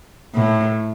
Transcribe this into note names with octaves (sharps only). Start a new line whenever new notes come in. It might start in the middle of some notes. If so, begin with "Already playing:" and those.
A2